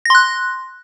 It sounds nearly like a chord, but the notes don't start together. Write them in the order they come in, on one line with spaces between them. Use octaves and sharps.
A#6 C6 F#6